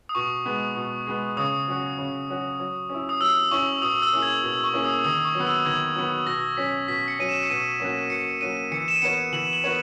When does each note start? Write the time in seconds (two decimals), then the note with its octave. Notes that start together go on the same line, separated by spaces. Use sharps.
0.09 D#6
0.15 B2 C#6
0.45 G#3 B3
0.76 B2
1.07 G#3 B3
1.37 C#3 D#6
1.67 F#3 C#4 F#4
1.98 C#3
2.29 F#3 C#4 F#4
2.60 F#3
2.90 C#4 E4
3.09 D#6
3.21 F#3 E6
3.51 C#4 E4 C#6
3.82 B2 D#6
4.02 E6
4.13 A#3 C#4 E4 G#4
4.23 G#6
4.43 B2
4.64 C#6
4.74 A#3 C#4 E4 G#4
4.84 D#6
5.04 D#3 D#6
5.25 C#6
5.35 F#3 B3
5.45 E6
5.66 D#3 G#6
5.96 F#3 B3
6.26 B2 A#6
6.57 F#3 C#4 B6
6.88 B2 B6
7.08 C#7
7.19 F#3 C#4 D#7
7.29 E7
7.43 C#7
7.49 B2 D#7
7.80 F#3 A#3 C#4 F#4
8.10 B2 C#7
8.41 F#3 A#3 C#4 F#4 D#7
8.71 E3 C#7
8.88 E7
8.95 D#7
9.02 B3 F#4 A#4 C#5 C#7
9.32 E3 F#7
9.53 F#7
9.64 B3 F#4 A#4 C#5